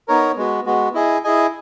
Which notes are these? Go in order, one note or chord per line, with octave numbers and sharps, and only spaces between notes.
B3 D#4 A#4 C#5
G#3 B3 F#4
G#3 B3 F#4
E4 G#4 D#5 G#5
E4 G#4 D#5 G#5